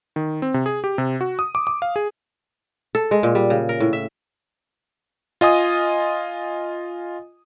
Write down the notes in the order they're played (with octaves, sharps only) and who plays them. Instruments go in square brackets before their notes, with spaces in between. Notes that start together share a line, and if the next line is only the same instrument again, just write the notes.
[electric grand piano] D#3
C4
C3
G#4
G4
C3
F#4
D#6
D6
D6
F5
G#4
[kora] A4
G#3
A#2
G3
C#3
A#4
A2
E5
[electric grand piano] F4 D#5 G#5 D#6